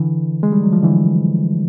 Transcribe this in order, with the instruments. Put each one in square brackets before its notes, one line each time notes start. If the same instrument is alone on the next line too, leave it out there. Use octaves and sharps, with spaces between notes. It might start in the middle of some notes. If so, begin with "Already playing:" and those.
Already playing: [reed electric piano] D3 E3
G#3
G3
F#3
F3
D3 E3